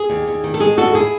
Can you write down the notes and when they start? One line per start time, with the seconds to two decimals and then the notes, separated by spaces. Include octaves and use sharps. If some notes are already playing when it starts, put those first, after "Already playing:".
Already playing: G#4
0.10 D#2
0.28 D#2
0.44 D#3
0.54 A4
0.60 G#3 G#4
0.78 D#2 F#4 A4
0.94 E4 G#4